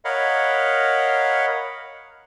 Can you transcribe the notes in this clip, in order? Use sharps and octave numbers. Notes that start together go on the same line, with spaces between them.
A#4 C#5 D#5 F5 F#5 B5